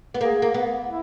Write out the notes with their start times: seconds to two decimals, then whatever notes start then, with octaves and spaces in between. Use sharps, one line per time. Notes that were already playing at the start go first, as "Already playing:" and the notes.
0.14 B3
0.21 A#3 G#4
0.42 A#3
0.54 B3
0.87 E4